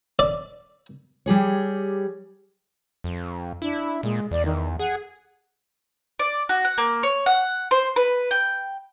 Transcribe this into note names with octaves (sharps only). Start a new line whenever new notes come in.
D5
G3 G4 G#4 C#5
F2
D4 E4
A#2 G#3
E2 D5
D#3
G#4 F#5
D5
F#4
F#5
A#3
C#5
F#5
C5
B4
G5